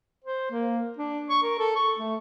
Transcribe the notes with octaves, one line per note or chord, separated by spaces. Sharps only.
C5
A#3
D4
C#6
A#4
A4
C#6
A3